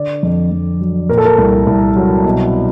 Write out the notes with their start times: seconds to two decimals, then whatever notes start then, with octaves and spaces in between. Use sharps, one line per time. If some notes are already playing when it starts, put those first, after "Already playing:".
Already playing: D3 D5
0.23 F2
0.52 F2
0.81 F#3
1.09 A#2 A#4
1.18 A4
1.25 A#4
1.38 C2
1.67 C2
1.96 F#3
2.25 B2